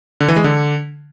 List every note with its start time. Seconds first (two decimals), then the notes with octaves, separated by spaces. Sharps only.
0.20 D3
0.28 E3
0.36 G#3
0.44 D3